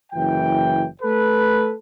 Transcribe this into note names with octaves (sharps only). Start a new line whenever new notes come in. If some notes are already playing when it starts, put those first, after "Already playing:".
F#1 E3 G5
A3 A4 B4